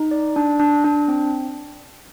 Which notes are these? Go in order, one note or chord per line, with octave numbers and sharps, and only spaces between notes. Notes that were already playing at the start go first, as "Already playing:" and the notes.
Already playing: D#4
D5
D4
D4
D4
C4